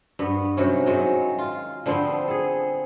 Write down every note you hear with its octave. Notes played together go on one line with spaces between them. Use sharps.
G2 B3
C3 D#3 F#3 C#4
D#3 F#3 G#3
F4
D3 F3 B3 C4
G#4 A4